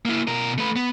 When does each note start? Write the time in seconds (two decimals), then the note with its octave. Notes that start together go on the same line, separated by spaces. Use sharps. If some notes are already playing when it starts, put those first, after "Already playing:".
0.05 A#3 E4
0.27 B2 A#4
0.58 A3 B4
0.76 B3